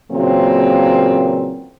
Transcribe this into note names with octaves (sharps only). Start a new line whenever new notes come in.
A#2 C#3 E3 F#3 A#3 C4